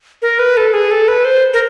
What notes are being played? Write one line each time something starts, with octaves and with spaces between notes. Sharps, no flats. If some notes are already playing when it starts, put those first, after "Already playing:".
A#4
B4
A4
G#4
A4
B4
C5
A#4